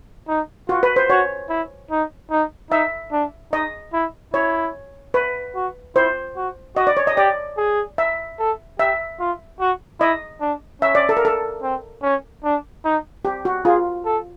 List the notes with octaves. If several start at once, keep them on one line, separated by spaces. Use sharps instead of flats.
D#4
F4 F#4
B4
C5
F#4 C#5
E4
D#4
D#4
D#4 E5
D4
D#4 D#5
E4
E4 C#5
B4
F#4
E4 C5
F#4
F#4 D#5
D5
C#5
D#5
G4 D5
G#4
E5
A4
G4 E5
F4
F#4
E4 D#5
D4
C#4 E5
D5
A4
A#4
A4
C4
C#4
D4
D#4
G4
F#4
F4 G#4
A4